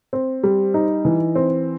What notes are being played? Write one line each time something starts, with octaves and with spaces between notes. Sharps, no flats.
C4
G3
D#4
E3
C4